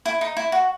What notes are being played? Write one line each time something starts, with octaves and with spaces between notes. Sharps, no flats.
E4
D#4
E4
F#4